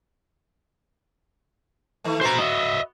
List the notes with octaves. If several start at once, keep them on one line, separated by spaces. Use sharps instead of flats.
D#3 A3
B3 F#4 B4 C5 A#5
D#5 E5